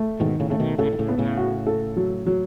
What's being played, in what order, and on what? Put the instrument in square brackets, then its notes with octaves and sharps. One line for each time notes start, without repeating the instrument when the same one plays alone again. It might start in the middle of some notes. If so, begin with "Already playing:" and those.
Already playing: [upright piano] A3
[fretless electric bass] G#2 B2 [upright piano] D#3
[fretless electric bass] A2 C#3
[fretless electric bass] C#3 [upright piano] A3
[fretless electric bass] B2 D#3
[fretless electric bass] A2 C#3 [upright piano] A4
[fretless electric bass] D#3
A2 C#3
[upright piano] B3
[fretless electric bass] A2 C#3
[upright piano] F#4
A4
F#3
F#3